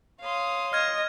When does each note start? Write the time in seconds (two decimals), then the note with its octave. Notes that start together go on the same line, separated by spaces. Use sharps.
0.21 C#5 F5 C6 D#6
0.73 D#5 F6 G#6